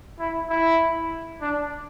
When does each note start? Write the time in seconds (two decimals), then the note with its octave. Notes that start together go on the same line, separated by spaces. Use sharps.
0.19 E4
0.50 E4
1.42 D4